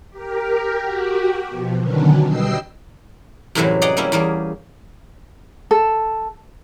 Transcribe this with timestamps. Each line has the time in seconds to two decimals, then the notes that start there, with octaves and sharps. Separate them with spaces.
0.10 G4 A#4
0.79 F#4 G4
1.48 B2 F3
1.76 D3 D#3 F#3 B3 C#4 D4
2.27 B2 G3 D#5 G5 E6 C7
3.55 F#2 A2 C3 E3 F#3 G3
3.82 G#4 D5 D#5 F#5 A#5
3.97 G3 A#3 C#4 E4
4.12 E2 G3 A#3 G#4
5.71 A4